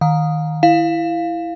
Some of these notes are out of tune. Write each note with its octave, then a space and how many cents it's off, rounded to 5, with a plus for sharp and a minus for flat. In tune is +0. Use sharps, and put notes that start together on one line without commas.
D#3 +0 F5 +35
E4 +5 F5 +0